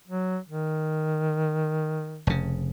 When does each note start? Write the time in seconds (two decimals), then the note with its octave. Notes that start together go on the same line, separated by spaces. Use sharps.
0.08 F#3
0.49 D#3
2.27 F1 C#3